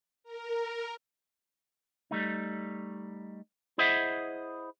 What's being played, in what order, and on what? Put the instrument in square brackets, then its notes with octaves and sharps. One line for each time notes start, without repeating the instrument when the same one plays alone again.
[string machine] A#4
[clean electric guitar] G3 A3 D#4
E4 G#4 C5 D#5 E5 F#5